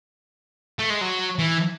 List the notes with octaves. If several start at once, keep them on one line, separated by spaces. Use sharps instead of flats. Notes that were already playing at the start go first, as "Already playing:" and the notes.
A3
G#3
F#3
E3